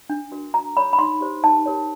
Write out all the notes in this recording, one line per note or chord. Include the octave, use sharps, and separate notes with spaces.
D4
F#4 A#4
F#4 A#5
A4 C#5 B5
B5
D#4 C6
G4 C5
D#4 A5
G4 A#4 C#5